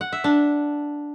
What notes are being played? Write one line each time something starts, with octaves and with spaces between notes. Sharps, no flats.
F#5
E5
D4